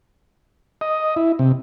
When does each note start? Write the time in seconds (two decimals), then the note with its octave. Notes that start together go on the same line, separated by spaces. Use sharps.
0.81 D#5
1.16 E4
1.39 C3